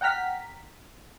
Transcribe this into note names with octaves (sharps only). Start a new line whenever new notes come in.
F#5 G5 A#5 F6 B6